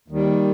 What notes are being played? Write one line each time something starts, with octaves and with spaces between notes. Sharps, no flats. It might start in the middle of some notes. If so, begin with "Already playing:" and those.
D#2 D#3 G3